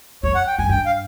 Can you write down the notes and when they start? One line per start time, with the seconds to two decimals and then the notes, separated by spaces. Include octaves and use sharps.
0.23 F2 C#5
0.35 F#5
0.47 G5
0.58 F#2 G#5
0.69 G2 G5
0.86 F5